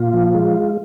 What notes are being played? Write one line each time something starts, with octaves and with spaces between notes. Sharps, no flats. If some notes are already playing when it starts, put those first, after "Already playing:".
Already playing: A#2 F4
F3
G#3